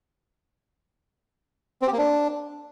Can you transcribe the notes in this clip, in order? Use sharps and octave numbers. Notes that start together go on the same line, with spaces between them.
C4
G4
A#3
D4